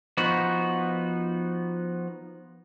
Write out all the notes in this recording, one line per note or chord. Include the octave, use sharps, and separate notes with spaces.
F3 B3 D#4 F#4